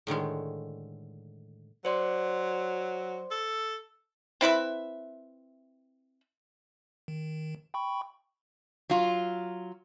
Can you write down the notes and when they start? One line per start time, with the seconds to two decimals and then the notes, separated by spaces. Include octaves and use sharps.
0.07 A2 D3 D#3 G#3
1.85 F#3 C5 D5 C6
3.31 A4
4.41 C4 E4 B4 E5
7.08 D#3
7.74 G5 B5 C#6
8.90 F#3 F4